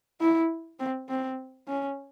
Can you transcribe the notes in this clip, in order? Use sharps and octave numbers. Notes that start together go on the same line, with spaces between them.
E4
C4
C4
C#4